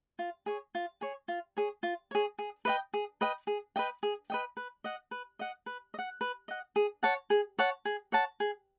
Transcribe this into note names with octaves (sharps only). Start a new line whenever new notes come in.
F4
G#4 C#5
F4
G#4 C#5
F4
G#4 C#5
F4
G#4 C#5
G#4
B4 D#5 G5
G#4
B4 D#5 G5
G#4
B4 D#5 G5
G#4
B4 D#5 G5
B4
D#5 F#5
B4
D#5 F#5
B4
D#5
F#5
B4
D#5 F#5
G#4
C#5 F#5 A5
G#4
C#5 F#5 A5
G#4
C#5 F#5 A5
G#4